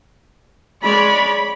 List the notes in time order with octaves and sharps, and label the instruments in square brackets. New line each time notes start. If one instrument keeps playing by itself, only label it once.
[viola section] G#3 C#5 [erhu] D5 [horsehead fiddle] B5